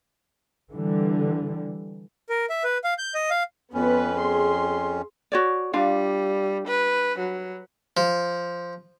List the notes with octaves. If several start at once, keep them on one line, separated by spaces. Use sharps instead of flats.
D3 E3 G3
A#4
E5
B4
F5
G6
D#5
F5
F2 B3 C#4 F4 B4
G#4 C6
F#4 C#5 D5
G3 D4 F4 F5
B4
F#3
F3